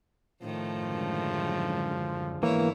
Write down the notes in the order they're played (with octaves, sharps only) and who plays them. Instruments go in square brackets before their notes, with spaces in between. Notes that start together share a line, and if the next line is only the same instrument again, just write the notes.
[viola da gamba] A2 D#3 A3 [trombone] F3
[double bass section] F#2 D3 G#3
[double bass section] G#2 D3 B3 [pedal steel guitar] E3 A#3 [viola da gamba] E4 C#5